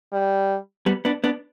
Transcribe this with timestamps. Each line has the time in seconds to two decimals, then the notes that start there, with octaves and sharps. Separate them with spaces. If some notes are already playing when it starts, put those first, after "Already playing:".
0.13 G3
0.86 G3 B3
1.05 B3 D4
1.24 B3 D4